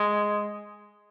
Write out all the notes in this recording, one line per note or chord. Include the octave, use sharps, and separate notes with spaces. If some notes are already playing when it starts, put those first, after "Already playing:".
Already playing: G#3